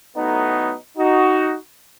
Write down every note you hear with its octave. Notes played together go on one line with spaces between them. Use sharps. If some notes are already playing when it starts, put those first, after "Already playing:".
A2 F#3 A3 B3 D#4
D#4 F#4